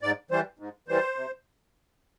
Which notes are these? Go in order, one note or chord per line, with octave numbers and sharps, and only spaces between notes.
G#2 D5
E3 G3 C5
G#2
E3 G3 C5
C3